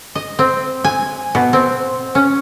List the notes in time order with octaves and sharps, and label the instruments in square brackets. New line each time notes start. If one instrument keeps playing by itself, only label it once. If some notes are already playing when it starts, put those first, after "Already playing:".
[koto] D#5
C4
G#5
B2
C4
C#4